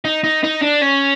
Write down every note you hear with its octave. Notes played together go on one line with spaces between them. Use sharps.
D#4
D#4
D#4
D4
C#4